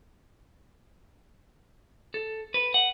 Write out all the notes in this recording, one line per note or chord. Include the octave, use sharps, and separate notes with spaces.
A4
B4
F#5